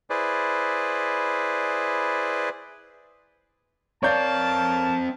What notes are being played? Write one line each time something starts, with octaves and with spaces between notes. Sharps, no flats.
E4 G#4 B4 C5 D5
C4 A#4 C#5 D5 F5 A5 G6